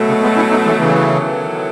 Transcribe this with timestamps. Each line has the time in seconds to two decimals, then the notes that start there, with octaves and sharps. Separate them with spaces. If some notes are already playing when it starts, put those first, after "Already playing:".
Already playing: B2 F#3 A3
0.08 C#3
0.22 G#3 B3
0.36 C#4 E4
0.51 B3 D#4
0.65 E3 G#3
0.79 C#3 E3
0.94 D#3 F#3 B3 E4 A4